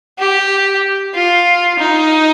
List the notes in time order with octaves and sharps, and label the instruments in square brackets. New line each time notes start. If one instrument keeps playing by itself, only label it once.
[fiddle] G4
F4
D#4